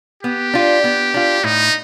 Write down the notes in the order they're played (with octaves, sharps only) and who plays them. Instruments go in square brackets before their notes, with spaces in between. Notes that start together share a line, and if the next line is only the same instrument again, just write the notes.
[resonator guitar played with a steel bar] B3 [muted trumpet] G4
[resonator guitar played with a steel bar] D4 F4
B3
D4 F4
[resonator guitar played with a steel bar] A2 [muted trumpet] D#4